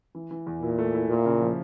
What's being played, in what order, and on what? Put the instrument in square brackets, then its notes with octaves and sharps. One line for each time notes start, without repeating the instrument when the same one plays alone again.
[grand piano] E3
E3
E2
[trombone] A#2 [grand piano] E4
[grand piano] A3
E4
[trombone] A#2 [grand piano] A#3
[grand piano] C#3
F3